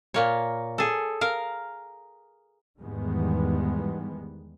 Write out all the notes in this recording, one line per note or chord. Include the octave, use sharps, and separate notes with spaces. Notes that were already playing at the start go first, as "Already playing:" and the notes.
A#2 A#3 C#5
G#4 A4
A#4 F5
E2 G#2 D#3 G3 G#3 B3